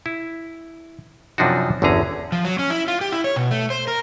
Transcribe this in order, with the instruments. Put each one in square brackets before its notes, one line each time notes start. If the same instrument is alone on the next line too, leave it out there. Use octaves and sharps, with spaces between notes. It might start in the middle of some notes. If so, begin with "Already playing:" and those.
[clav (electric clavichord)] E4
F#2 C3 F3 D4 D#4 F#4
G1 E2 D3 C#4 G#4 A#5
[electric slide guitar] F3
F#3
C#4
E4
F4
G4
E4
C#5
B2
A3
C5
A#4